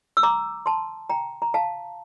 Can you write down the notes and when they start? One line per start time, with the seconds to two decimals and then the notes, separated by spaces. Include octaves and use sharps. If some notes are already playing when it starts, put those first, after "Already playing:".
0.17 E6
0.23 A#5 D6
0.66 A5 C6
1.10 G5 A#5
1.42 A#5
1.54 F5 A5